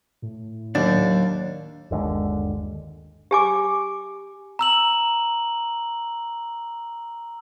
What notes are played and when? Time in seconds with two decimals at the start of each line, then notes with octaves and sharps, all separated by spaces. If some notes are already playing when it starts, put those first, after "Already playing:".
0.22 A2
0.75 D#2 F#3 D4
1.91 G1 D#2 D3 G#3
3.31 G4 G#5 D6
4.59 A#5 E6 F#7